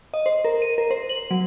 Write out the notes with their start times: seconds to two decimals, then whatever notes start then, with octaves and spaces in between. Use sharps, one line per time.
0.14 D#5
0.26 C5
0.45 A#4
0.62 D#7
0.78 A#4
0.91 C5
1.09 F#7
1.31 F#3